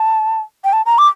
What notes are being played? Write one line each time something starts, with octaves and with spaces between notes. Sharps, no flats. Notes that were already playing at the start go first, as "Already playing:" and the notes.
Already playing: A5
G5
A5
A#5
D6